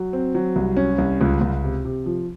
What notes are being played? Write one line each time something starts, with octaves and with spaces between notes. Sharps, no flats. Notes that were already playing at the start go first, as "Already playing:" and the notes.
Already playing: F#3
C4
F#3
C2
C#4
C2
C#2
C#2
C3
C3
F3